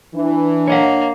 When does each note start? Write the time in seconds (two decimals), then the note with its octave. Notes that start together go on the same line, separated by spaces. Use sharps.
0.14 E3 D4
0.68 A#3 C#5 D#5 F#5